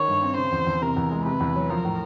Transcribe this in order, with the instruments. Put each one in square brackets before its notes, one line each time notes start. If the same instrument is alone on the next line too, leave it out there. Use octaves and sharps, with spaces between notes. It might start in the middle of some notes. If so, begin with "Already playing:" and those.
Already playing: [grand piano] D#3 C#4 [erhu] C#5
[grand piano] G2
C4
[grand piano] C#3 [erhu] C5
[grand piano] E2
E2
[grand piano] C3 [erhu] A#4
[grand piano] E2
G#3
[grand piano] C3 [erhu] B4
[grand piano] E2
F#3
[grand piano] F3 [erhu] A#4
[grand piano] A2